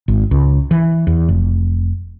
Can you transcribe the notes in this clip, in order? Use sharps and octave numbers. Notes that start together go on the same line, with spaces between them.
G#1
C#2
E3
E2
F1